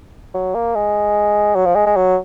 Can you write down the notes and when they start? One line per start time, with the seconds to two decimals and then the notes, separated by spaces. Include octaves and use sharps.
0.34 F#3
0.55 A#3
0.75 G#3
1.55 F#3
1.65 F3
1.75 G#3
1.86 G#3
1.96 F#3